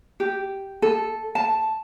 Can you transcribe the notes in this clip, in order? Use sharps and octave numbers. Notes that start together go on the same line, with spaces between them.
G4
A4
A5